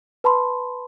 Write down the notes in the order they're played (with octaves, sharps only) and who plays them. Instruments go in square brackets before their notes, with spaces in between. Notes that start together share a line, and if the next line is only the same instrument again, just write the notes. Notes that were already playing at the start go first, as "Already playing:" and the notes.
[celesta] B4 A5 B5 C6